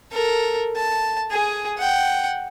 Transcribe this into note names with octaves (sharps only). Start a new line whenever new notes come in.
A4 A#4
A5
G#4 G#5
F#5 G5